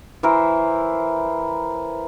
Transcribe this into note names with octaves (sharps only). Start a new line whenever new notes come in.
E3 E4 A#4 C5